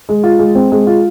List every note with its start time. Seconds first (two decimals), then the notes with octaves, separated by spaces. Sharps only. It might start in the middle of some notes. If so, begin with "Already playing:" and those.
0.09 G#3
0.24 F4
0.39 G#3
0.55 C4
0.72 G#3
0.87 F4